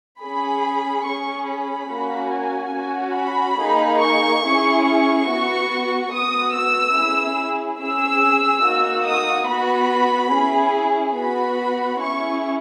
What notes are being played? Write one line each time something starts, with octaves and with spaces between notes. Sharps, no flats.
C#4 G#4 B5
C#4 G#4 C#6
B5
A#3 C#4 F#4
G#5
C#4 F#4
B5
A#3 D#4 G#4
C#6
C#4 E4 G#4
C#6
B3 F#4
B3 F#4 D#6
E6
C#4 E4 G#4
C#4 G#4 E6
A#3 D#4 F#4
D#6
B3 F#4 B5
C#4 E4 G#4
B3 F#4 B5
C#4 E4 G#4 C#6